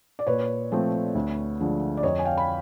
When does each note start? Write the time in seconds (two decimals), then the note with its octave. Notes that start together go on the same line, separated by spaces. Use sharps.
0.19 D5
0.27 A#2 B4 C#5
0.72 F3 A3 C4
1.15 D2
1.60 D3 F3 G#3
1.97 D5
2.03 F2 C#5 D#5
2.19 G#5
2.25 F5 G5
2.37 B5